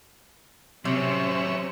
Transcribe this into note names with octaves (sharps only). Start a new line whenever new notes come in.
C3 F#3 C4 C#4 C5 C#5 E5